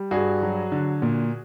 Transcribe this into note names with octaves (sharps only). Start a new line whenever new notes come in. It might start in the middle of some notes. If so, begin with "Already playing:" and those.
Already playing: G3
G2 F#4 G#4
F#3
D3
A#2